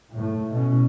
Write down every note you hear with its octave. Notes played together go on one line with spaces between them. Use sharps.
A2
B2 C#4